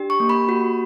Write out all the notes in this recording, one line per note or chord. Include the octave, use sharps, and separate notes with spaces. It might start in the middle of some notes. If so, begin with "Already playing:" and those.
Already playing: D4 G4
C#6
A#3
B5
F#4